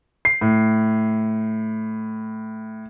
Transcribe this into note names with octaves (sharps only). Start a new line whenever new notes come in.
C7
A2